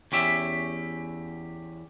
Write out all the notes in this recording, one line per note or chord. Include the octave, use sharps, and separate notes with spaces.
E2 C#4 G4 E5